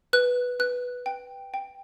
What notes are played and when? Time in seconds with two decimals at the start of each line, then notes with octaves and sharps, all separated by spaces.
0.13 B4 F#6
0.60 B4 F#6
1.06 G5
1.54 G5